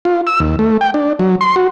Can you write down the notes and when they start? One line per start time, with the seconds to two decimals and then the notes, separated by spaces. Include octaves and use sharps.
0.05 F4
0.27 E6
0.40 D#2
0.59 A3
0.81 G5
0.94 D4
1.19 F#3
1.41 C6
1.56 F#4